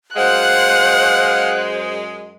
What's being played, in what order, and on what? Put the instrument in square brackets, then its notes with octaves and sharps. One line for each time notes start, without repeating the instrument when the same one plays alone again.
[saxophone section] F#2 G#3 [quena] C5 [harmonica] F5 F#5 [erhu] F#6